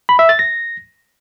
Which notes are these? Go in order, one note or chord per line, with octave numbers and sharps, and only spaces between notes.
B5
E5
A6
A#6